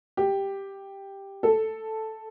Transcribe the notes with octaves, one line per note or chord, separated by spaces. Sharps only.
G4
A4